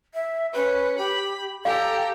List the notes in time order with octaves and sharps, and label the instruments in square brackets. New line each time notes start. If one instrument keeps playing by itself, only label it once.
[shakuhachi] E5
[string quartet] C#4 [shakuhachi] B4
[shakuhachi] G4 [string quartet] B5
[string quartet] G4 G5 A#5 [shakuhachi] A4 [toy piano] F5 G#5